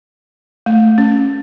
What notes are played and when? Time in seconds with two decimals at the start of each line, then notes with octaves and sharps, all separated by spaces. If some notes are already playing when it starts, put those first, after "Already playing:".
0.66 A3
0.98 C#4